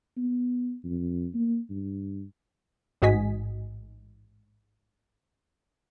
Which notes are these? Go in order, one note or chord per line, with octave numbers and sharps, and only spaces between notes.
B3
F2
A#3
G2
A1 G#2 F#4 D#5 G#5 B6